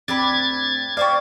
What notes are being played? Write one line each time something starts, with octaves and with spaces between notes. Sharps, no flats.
D2 C4 D4 G4 B5 G#6 A6
G4 C5 D5 F5 C#6